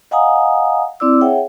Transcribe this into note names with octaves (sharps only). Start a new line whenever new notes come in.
D#5 F5 F#5 G#5 A#5 D#6
C4 E4 D5 D6 E6
G#4 C#5 E5 F#5 G5